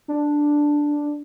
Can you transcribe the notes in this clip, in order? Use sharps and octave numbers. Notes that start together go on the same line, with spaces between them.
D4